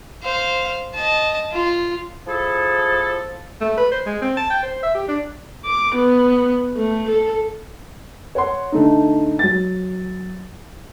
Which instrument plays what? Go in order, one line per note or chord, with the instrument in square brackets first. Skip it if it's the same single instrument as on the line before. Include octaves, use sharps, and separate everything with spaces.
[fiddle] C5 F5
D#5 A5
F4
[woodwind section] F3 E4 G#4 A4
[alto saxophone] A3
B4
C5
G#3
C4
A5
G5
C5
E5
G4
D4
[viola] D6
B3
A3
A4
[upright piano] C#5 F#5 C6
D3 A3 D#4
F#3 A6